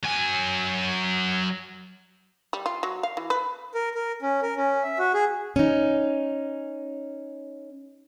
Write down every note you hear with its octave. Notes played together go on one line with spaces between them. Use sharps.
F#3 G#5
G3
F4
F#3
F5
E3
B4
A#4
A#4
C#4
A#4
C#4
E5
F#4
G#4
C#4 D#4